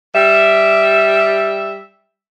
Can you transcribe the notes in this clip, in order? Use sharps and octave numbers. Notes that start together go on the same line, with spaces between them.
G3 E5